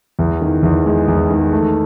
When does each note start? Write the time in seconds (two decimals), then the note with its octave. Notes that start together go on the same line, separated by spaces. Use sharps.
0.19 E2
0.41 D#3
0.63 E2
0.86 G#3
1.08 E2
1.30 D#3
1.51 A3